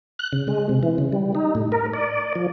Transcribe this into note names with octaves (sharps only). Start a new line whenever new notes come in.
F#6
C#3
G#3
C3
E3
C#3
G3
D#4
A2
A#4
D5
F3